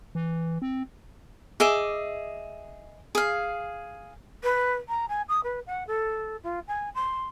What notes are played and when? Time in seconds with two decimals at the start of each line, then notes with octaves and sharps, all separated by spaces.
0.15 E3
0.62 C4
1.60 G#4 D#5 E5 D6
3.15 G#4 F5
4.44 B4
4.88 A#5
5.09 G#5
5.29 D#6
5.44 B4
5.67 F#5
5.87 A4
6.43 F4
6.68 G#5
6.95 C6